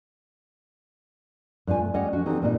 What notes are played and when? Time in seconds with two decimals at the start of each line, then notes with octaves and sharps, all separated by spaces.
1.67 G2 B2 F4 G#5
1.81 A3
1.94 G3 C#4 C#5 D#5 F#5
2.13 F3 D4 F#4
2.26 E3 C4 D#4 G4 A4
2.42 G2 A#2 G3 D4 D#4